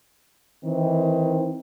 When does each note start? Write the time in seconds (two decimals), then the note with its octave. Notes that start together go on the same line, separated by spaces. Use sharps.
0.64 D#3 E3 C4